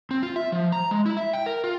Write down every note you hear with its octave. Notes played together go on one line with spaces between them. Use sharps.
C4
F4
E5
F3
A#5
G#3
E4
E5
G5
A#4
F4